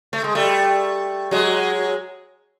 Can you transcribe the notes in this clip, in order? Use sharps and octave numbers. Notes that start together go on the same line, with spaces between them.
A3
G#3
G3 A3
F#3 G#3